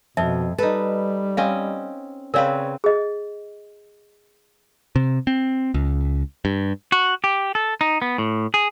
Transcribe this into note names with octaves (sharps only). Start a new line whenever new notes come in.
F2 B2 E5 A5
G3 D#4 A4 B4
C4 C#4 D#5 F5
C#3 C4 A#4 B4 C#5 D5 F5
G#4 D#5
C3
C4
C#2
G2
F#4
G4
A4
D#4
B3
A2
G#4